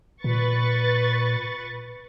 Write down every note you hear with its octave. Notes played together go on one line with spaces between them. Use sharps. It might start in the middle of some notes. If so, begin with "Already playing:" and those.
A#2 B4 C#6 A6